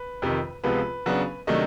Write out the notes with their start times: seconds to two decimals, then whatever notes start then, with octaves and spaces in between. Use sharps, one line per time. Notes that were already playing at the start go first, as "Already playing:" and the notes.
Already playing: B4
0.22 F2 C3 D#3
0.64 C#2 C3 F3 G#3 B3 B4
1.06 C#3 F#3 B3 D4
1.47 C3 D#3 F#3 A3 D4 D#5